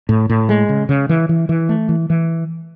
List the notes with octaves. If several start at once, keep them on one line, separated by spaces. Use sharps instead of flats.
A2
A2
G#3
C#3
C#3
E3
E3
E3
A3
E3
E3